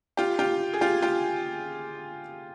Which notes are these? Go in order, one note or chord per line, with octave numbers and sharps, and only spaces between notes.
F4 G4
F4 G4
G#4
F4 G4
F4 G4